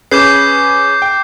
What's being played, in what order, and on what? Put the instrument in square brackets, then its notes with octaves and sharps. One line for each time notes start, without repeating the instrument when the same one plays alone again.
[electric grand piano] C#4 G#4 B4 [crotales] D6 G6 C7
[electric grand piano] G5